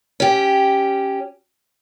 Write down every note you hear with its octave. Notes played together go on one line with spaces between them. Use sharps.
C#4 G4